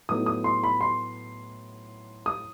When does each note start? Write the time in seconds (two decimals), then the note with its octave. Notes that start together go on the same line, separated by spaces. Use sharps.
0.09 A2 F#3 B3 D#4 D#6
0.26 D#6
0.44 C6
0.63 B5
0.81 C6
2.26 D#6